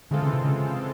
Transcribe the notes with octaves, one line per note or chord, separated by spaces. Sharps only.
D3 E3 G#3 C4 F4 A4
C#3
C3
C#3